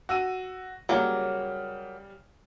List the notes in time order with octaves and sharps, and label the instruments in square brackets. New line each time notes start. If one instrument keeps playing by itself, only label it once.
[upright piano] F#4 E6 D#7
[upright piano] C#3 G3 [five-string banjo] F#3 A#3